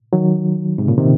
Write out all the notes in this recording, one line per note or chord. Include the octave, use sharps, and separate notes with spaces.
D#3 F#3
G#2 C3
A#2 C#3
C3 D#3